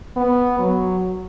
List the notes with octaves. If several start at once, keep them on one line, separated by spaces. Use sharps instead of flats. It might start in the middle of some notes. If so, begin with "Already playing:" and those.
B3
F#3